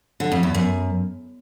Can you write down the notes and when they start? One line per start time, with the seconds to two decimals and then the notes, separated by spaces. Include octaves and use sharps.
0.20 D3
0.32 F2
0.43 E2
0.55 F#2